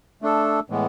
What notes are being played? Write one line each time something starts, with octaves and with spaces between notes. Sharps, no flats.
A3 D4 A4
A2 E3 G#3 B3